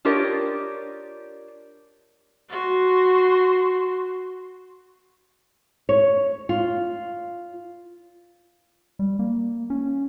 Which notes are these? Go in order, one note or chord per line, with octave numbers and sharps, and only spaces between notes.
D4 F4 G4 A#4 C#5 D#5
F#4 C6
C#5
F4
G3
A#3
C#4